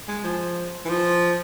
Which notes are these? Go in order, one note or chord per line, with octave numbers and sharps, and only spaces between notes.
G#3
F3
E3
F3